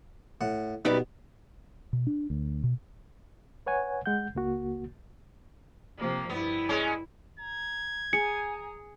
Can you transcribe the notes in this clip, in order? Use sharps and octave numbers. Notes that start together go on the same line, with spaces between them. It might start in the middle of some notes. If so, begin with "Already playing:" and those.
A2 F#5
F#2 B2 G3 B3 D#4 F#4 B4
B2
D4
D2
B2
B4 C#5 F#5 G#5
G#3 F#5 G6
C#2 A#3 F#4
C3 F3 A#3
G2 B3 E4
G#3 C#4
A#5 G#6
G#4 G#5 A#5 C#7